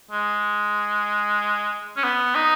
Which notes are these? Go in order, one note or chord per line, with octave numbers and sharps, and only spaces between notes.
G#3
C#4
B3
D#4